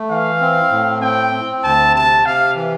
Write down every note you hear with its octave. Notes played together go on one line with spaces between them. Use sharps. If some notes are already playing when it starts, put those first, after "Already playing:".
Already playing: A3
E3 F5
C4
A2
C4 G5
C4
D2 A5
C3 A5
C3 F5
E3